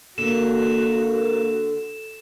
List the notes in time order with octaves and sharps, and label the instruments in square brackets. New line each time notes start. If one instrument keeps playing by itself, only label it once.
[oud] D3 [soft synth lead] A#3 [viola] F#4 [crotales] E7